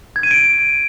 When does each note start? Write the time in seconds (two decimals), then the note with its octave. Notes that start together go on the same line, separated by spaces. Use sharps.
0.16 G#6
0.23 D#7
0.31 D7